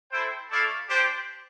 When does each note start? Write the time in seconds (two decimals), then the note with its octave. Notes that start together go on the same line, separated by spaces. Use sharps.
0.12 E4 A4 C5 G5
0.50 A3 E4 A4 D5 F5
0.87 D4 G4 C5 G5